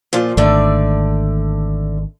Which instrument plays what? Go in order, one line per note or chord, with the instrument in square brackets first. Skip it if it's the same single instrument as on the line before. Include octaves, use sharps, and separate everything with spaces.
[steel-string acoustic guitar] A#2 F3 F4
[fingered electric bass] G#1 [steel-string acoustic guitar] D3 A3 D5